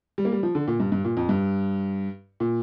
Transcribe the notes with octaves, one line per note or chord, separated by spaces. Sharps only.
G3
A#3
G3
F3
D3
A#2
G2
G2
A#2
F2
G2
A#2